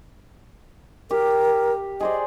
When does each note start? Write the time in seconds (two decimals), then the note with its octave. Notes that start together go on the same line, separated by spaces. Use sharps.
1.11 G4 A#4
2.01 G#4 C5 D5 D#5